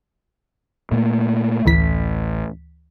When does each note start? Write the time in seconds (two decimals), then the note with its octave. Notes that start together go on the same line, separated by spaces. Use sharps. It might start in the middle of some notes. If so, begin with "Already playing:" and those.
0.92 A#2 A3 A#3
1.66 A1 D2 E3 B6